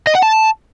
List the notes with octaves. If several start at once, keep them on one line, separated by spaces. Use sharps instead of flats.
D#5
F#5
A5